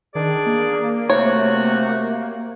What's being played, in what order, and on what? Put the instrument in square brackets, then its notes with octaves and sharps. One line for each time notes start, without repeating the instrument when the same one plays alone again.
[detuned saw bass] D#3 [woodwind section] D4 G#4 D5
[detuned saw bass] A#3
[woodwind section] C3 A3 F#4 [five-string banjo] C#5